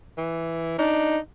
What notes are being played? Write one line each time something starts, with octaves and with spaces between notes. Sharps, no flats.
E3
D4 D#4